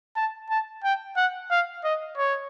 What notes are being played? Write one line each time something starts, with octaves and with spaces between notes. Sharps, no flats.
A5
A5
G5
F#5
F5
D#5
C#5